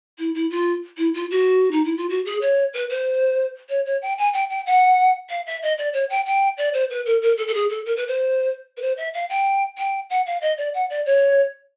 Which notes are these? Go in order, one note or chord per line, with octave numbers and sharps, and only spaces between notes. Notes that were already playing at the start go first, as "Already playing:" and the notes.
E4
E4
F4
E4
F4
F#4
D#4
E4
F4
F#4
G#4
C#5
B4
C5
C#5
C#5
G5
G#5
G5
G5
F#5
F5
E5
D#5
D5
C#5
G5
G5
D5
C5
B4
A#4
A#4
A4
A4
G#4
A4
A#4
B4
C5
B4
C5
E5
F5
G5
G5
F#5
F5
D#5
D5
F#5
D5
C#5